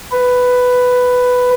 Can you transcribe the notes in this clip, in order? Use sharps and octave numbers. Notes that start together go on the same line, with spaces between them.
B4